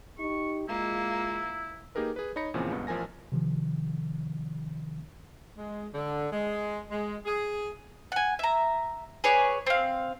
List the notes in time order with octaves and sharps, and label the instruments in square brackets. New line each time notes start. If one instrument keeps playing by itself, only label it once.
[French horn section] D#4 G4 [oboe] C#6
[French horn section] G#3 F4 [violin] A#3 [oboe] E4
[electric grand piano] A#3 D#4 G4 G#4 A#4 B4
G#4 B4
D#4 C#5 D#5 B5 A#6 C#7
E2 A#2 C#3 E3 F3 C4
C#2 G2 B3
A1 F3 A#4 G#5 A#6
[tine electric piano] C3 D#3 F3
[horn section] G#3
D3
G#3
G#3
G#4
[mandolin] F#5 G#5
E5 A#5
G#4 B4 C#5 D5
C4 F5